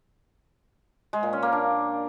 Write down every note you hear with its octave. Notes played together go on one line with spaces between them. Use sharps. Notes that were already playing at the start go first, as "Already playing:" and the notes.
G#3
A#2
C#4
A#3
D4